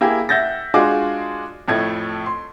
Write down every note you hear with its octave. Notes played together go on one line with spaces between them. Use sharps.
A#3 E4 G4 G#4
E5 F#5 G6 A6 A#6
G#3 D4 F4 F#4 G#4 D6
F2 A2 A3 G#6
C6